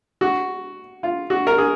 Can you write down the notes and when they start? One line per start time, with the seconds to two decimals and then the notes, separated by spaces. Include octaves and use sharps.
0.21 F#4
1.03 F4
1.30 F#4
1.47 A#4
1.58 G#4